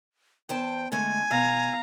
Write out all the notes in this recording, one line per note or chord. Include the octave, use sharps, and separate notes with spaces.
E2 C5 G5 A5
D3 G#3 A3 G#5
B2 F5 A#5